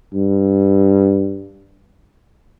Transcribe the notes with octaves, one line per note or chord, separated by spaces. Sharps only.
G2